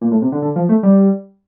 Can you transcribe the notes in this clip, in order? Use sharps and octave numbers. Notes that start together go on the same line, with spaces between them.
A#2
A2
C3
D3
D3
F3
A3
G3